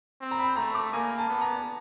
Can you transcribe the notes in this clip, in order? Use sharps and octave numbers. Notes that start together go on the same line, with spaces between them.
C4
A#5
B5
A3 A#5
D6
A#3 G#5
A5
B3
A#5